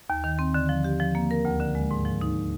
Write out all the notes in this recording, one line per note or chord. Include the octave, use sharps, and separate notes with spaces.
D#2
D#3
C4
D3
F3
G4
F3
A#3
A#4
D2
D3
G#3
G#2
F3
D#4